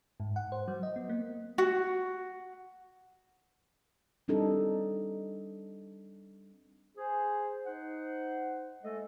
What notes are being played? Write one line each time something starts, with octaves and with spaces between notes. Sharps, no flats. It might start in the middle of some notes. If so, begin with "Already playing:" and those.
G#2
F#5
C5
F#3
D#5
B3
A#3
F#4
G3 C4 D4 D#4 G4 A4
G#4 C5
D#4 C5 F#5
G#3 A3 A4 D#5